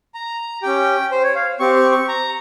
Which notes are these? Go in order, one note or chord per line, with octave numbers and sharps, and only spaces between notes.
A#5
C#4 G4 G5
C5
C#5
F5
C4 G4 C#6
C#6
C#6
A#5